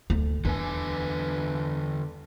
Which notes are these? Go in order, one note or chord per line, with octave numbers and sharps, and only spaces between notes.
D2
E2 D3 B4 G#5